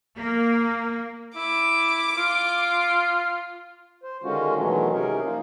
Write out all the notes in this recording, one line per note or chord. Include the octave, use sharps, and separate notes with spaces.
A#3
E4 D6
F4
C5
D3 D#3 G#3 C#4 F4 F#4
B2 D#3 E3 F#3 G#3 A3
C3 C#4 D#4 G#4 A#4
F3 A#3 D#4 F4